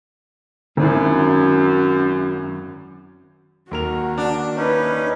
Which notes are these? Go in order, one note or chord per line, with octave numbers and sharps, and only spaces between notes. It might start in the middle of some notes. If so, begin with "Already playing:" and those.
G#1 F#2 E4
D#2 F#4 A#4 F7
D4
C#4 D#4 E4 B4